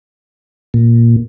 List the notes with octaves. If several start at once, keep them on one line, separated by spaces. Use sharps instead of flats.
A#2